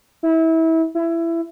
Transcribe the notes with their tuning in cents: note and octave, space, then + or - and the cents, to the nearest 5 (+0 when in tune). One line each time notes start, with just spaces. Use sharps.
E4 -25
E4 +20